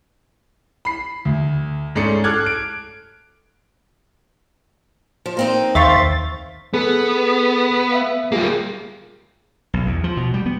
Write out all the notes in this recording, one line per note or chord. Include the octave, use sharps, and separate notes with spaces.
B5 C7
D2
G#2 G#3 A3 C#4 D5 C#7
A4 D6 F6 F#6 G#6
D7
F3
A#3 C4 D#4
D#2 C5 E5 F5 C#6 A6
B3 G#4 A4 B4
E5 F5
G3 A#3 F4 G4 G#4
B1
E2
F3
B2
G3
B3